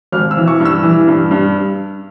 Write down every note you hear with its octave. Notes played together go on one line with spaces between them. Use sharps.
G#1 F6
E6
E3
C#6
G2
E6
E3
G2
G2